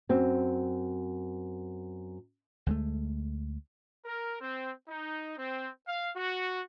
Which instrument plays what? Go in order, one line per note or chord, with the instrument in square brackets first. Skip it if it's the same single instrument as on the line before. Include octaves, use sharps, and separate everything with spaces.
[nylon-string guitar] F#2 C4
[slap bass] D2 G#3 A3
[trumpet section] A#4
C4
D#4
C4
F5
F#4